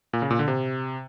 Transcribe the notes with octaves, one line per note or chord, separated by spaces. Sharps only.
A#2
C#3
A#2
D3
C3